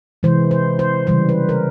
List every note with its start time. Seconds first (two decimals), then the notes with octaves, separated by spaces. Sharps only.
0.23 C3 E3 G#3 C5
0.51 C5
0.79 C5
1.07 C#3 E3 G3 C5
1.29 B4
1.49 A#4